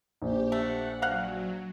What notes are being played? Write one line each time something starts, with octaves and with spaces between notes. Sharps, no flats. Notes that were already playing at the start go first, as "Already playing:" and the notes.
A#1 G4
A3 F#5
F#3 F5 F#5